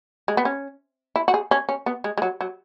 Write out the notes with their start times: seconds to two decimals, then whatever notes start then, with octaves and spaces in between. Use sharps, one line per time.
0.28 G#3
0.37 B3
0.45 C#4
1.16 E4
1.28 F#4
1.34 G#4
1.51 C#4
1.69 C#4
1.86 B3
2.04 G#3
2.18 G#3
2.22 F#3
2.41 F#3